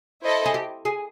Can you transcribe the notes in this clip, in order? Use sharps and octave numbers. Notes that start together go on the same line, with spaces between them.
E4 A4 C5 D#5
G#4
G4
G#4